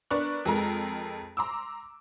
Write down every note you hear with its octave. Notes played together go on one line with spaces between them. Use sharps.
B3 D4 A#4 B5 C#6 F#6
F2 G#3 A4 A#4 A#5
A#5 C6 D6 E6